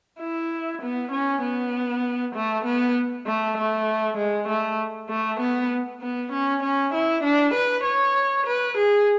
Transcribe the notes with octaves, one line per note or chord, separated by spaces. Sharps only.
E4
B3
C#4
B3
A3
B3
A3
A3
G#3
A3
A3
B3
B3
C#4
C#4
E4
D4
B4
C#5
B4
G#4